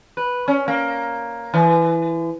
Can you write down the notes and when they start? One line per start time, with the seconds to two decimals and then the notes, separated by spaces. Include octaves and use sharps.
0.17 B4
0.48 C#4
0.68 A#3
1.54 E3